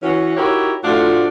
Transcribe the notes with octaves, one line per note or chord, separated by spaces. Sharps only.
E3 C#4 F#4
D#4 E4 F#4 G4 A#4 C#5
A2 F3 A3 D4 F4 F#4